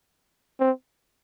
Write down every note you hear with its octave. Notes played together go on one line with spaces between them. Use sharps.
C4